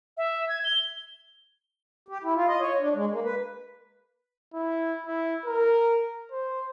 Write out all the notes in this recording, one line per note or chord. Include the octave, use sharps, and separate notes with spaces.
E5
G#6
G7
G4
E4
F4
D#5
C#5
D4
G#3
A#3
B4
E4
E4
A#4
C5